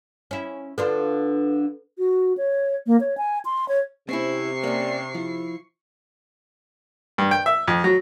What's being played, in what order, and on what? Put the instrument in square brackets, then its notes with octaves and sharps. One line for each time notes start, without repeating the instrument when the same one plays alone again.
[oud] C#4 E4
[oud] D3 D4 F4 [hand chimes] A4 B4
[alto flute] F#4
C#5
A#3
C#5
G#5
C6
C#5
[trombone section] C3 [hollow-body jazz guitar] C4 C#4 E4 [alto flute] C5 [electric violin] C#6 C7
[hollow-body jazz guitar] A#3 C#4 [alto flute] D5
[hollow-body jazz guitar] F3 [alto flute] E4
[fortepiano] G2
G5
E5
F2
F#3